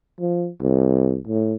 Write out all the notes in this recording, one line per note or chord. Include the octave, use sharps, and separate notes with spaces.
F3
C2
A2